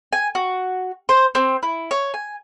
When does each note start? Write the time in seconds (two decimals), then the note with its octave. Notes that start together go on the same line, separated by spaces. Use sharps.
0.13 G#5
0.35 F#4
1.09 C5
1.35 C4
1.63 E4
1.91 C#5
2.14 G#5